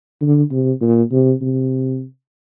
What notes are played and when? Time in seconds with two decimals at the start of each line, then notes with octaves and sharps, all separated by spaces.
0.21 D3
0.51 C3
0.81 A#2
1.12 C3
1.41 C3